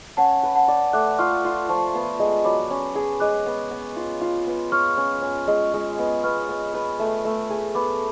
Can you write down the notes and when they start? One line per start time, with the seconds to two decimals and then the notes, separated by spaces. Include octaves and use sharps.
0.17 C#4 F#5 A5
0.43 B4
0.55 F#5 A5
0.68 D5
0.93 A3 D6 F#6
1.19 F4 C#6 F6
1.44 F4
1.69 F3 A5 C#6
1.94 B3
2.20 G#3
2.45 F#3 B5 D6
2.70 C#4
2.95 G#4
3.20 G#3 D6 F#6
3.46 B3
3.71 B3
3.96 F4
4.21 F4
4.46 B3
4.72 C#5 C#6 F6
4.97 C#4
5.22 C#4
5.48 G#3
5.74 G#3
5.98 B3
6.23 B3 C#6 F6
6.49 B3
6.74 B4
6.99 A3
7.25 A3
7.50 G#4
7.75 B3 B5 D6